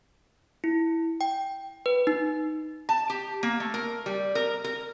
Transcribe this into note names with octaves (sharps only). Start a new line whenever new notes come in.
E4
G5
B4
D#4
A5
G4
A#3
A3
A#4
G3
A#4
A#4